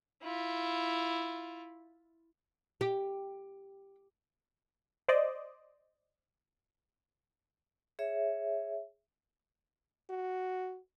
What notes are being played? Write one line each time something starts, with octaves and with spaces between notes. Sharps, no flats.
E4 F4
G4
C5 D5 D#5
G#4 C#5 E5
F#4